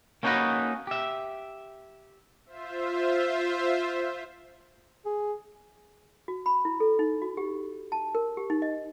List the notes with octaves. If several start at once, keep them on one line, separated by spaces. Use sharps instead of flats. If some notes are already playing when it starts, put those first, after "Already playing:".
A#3 C#4 D#4 F#4 B4 D#5
G4 E5
F4 C5 E5
G#4
F#4
B5
E4
A4
D#4
F#4
G4
A5
A#4
G4
D#4
D#5